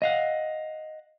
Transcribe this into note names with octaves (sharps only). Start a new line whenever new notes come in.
D#5 F5 F#5